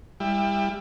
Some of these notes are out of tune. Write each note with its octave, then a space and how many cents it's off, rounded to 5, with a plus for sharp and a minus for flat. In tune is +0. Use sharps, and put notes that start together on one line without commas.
G3 +30 E4 +5